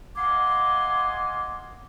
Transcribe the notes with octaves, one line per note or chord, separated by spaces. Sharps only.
D#5 F5 F#5 G#5 C6 D6